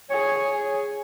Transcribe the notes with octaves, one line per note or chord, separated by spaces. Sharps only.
G#4 C#5